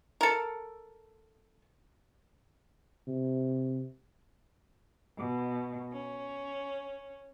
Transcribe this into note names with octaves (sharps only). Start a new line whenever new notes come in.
A4 A#4
C3
B2
C#4